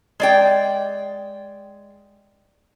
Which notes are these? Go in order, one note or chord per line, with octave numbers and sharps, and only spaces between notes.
G#3 D5 G5